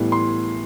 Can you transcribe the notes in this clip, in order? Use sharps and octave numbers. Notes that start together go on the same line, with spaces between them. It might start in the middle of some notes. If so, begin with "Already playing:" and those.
Already playing: A2 E3 G3 B3
C6